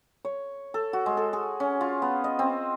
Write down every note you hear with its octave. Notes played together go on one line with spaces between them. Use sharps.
C#5
A4
F#4
G#3
A4
G#4
C#4
F4
B3
D#5
C4